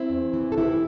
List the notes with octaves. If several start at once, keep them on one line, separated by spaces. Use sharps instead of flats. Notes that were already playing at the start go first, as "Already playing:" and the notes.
Already playing: C4 E4
E2
E3
A4
E3 E4 G4